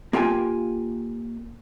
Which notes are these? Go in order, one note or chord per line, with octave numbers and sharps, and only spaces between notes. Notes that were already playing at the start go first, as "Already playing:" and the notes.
A#3 F4 G4 G5 G#5